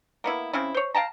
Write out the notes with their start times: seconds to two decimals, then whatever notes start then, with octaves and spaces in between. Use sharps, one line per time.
0.24 A#3 B3 E4
0.53 C#3 C4 C#4 E4
0.74 C5 C#5
0.95 F5 G5 A5 A#5